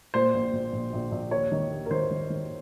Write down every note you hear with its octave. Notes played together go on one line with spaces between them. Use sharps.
A#2 C5
A#1
A#1
A#1
A#1
A#1
D#2 C#5
D#3
D#2
A#4
D#3 C5
D#3
D#3